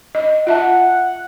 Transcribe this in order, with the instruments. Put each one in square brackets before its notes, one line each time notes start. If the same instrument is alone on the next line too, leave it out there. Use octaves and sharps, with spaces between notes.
[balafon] D#5
[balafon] F4 E5 A5 [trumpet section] F#5